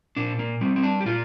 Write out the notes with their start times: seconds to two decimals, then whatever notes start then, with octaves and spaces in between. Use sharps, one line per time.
0.16 A#2 D4
0.39 A#3
0.61 G3 C4
0.76 C4
0.83 D4
1.01 G4
1.05 A#2 F4